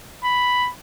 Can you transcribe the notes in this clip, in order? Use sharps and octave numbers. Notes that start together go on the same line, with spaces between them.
B5